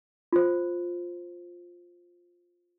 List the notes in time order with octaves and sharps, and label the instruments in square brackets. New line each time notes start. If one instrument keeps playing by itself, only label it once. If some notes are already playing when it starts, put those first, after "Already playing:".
[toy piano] F4 C5